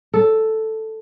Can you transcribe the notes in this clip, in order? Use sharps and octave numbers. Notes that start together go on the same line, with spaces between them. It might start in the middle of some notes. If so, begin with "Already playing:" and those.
A4